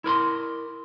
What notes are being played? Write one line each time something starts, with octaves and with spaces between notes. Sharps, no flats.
E4 A#4 B5 C6